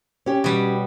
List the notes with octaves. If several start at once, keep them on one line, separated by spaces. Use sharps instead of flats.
C#4 G4 C#5
B2 G3